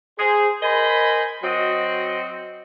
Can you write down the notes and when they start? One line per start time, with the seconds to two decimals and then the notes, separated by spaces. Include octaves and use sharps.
0.19 G#4 C5
0.62 A#4 C5 D#5 G#5 B5
1.44 F#3 C4 F#4 D#5